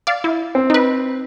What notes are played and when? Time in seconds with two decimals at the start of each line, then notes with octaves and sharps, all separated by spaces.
0.07 D5 F5
0.24 E4
0.55 C4
0.70 D#4 B4